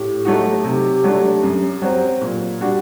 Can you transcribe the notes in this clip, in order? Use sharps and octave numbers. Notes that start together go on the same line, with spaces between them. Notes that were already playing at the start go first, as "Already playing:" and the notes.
Already playing: A2 G4
F#3 A3 D#4 F#4
C3
F#3 A3 D4
F#2
F#3 C4
A#2
G3 D4 F#4